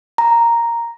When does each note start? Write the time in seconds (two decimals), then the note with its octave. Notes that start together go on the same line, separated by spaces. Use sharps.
0.18 A#5